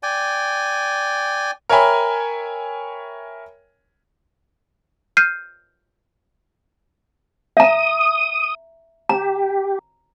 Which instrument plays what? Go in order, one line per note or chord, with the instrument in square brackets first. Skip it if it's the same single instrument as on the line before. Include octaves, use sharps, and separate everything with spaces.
[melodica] D5 G5 G#5
[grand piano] A#4 C#5 E5 G5 G#5 B5
[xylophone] F6 G6 C7 D#7
[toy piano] E5 A#5 [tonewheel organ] D#6
[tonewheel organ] G4 [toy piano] A#5